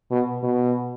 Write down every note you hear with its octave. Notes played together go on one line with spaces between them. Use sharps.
B2
B2